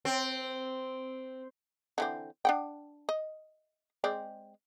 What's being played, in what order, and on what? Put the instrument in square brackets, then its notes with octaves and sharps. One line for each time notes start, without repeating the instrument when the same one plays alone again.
[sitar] C4
[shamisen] D3 E3 C4
D4 F#5 G5
D#5
G#3 C4 D5